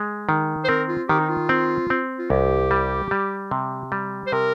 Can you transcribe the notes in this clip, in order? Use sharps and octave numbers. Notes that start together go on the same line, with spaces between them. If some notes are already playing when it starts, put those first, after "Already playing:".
Already playing: G#3
D#3
C5
C4 A#4
F4
D#3 G4
D#4
F4
C4
C4
F4
C2 G4
G3
G3
C3
G3
C5
C3 A#4